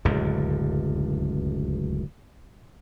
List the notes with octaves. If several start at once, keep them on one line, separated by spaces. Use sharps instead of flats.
D1 C#2 F#2 D3